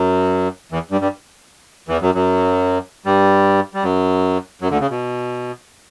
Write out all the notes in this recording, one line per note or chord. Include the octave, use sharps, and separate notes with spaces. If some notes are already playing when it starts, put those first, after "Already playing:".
Already playing: F#2 F#3
E2 E3
G2 G3
G2 G3
E2 E3
F#2 F#3
F#2 F#3
G2 G3
G3
F#2 F#3
F#2 F#3
D2 D3
C#3
B2